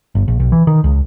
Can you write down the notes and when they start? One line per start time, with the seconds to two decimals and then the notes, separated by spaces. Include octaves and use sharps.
0.15 G1
0.28 A#1
0.39 B1
0.52 E3
0.67 D#3
0.84 C#2